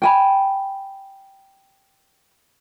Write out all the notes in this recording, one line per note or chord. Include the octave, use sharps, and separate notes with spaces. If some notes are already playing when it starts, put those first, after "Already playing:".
G5 G#5 B5